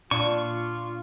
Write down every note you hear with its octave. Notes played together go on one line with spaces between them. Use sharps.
A#2 D4 F4 C#6